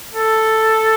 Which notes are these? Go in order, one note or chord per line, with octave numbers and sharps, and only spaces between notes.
A4